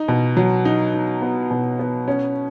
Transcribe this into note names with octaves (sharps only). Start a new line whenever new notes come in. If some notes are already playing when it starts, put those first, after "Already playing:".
Already playing: D#4
B2
F#3
D#4
D#4
B3
B2
B3
C#4